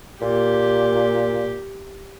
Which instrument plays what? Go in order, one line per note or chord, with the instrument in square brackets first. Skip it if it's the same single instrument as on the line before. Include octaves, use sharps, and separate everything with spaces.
[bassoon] A#2 [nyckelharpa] G4